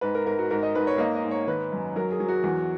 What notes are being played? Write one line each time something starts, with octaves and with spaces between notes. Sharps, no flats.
G#2 B4
A#4
G#2 A#4
F#4
G#2 A#4
D#5
G#2 B4
C#5
A#3 D#5
D#5
G#2
C#5
D#3 B4
F#2
F#3 A#4
G#4
F#3
F#4
E2